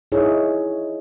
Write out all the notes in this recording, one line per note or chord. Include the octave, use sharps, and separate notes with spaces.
D#4 E4 G#4 C#5